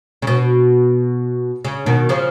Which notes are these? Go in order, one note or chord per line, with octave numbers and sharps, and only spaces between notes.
C#3
B2
C#3
B2 D#3
C#3 F3